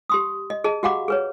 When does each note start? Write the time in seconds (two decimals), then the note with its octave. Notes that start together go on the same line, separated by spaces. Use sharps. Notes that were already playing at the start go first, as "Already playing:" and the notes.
0.10 G4 C6 D#6
0.50 D#5
0.64 G#4 D#5 A5
0.83 F#4 G4 F5 F#5 B5 D6
1.08 G#4 B4 C#5